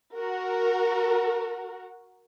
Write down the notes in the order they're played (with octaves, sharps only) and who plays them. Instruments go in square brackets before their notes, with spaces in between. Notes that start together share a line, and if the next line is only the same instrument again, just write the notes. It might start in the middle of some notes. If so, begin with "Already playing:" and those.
[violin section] F#4 A#4